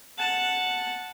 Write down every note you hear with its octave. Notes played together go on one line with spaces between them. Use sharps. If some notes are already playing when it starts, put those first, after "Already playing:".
F#5 A5